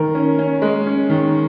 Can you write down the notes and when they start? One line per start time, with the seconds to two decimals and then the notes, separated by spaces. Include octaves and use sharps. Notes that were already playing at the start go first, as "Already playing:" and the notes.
Already playing: D#3 A#4
0.15 C#4
0.39 C#4
0.62 G#3
0.86 C#4
1.10 D#3